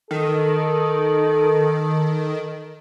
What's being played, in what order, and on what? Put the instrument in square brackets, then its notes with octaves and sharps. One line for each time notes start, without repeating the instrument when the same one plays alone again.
[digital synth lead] D#3 [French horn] A4